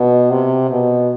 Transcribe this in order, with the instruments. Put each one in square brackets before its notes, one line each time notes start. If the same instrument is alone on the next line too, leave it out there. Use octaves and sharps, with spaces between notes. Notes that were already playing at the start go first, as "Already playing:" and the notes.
Already playing: [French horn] B2
C3
B2